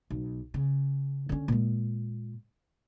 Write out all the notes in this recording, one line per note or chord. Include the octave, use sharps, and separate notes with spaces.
B1
C#3
D3 C#4
A#2 G#3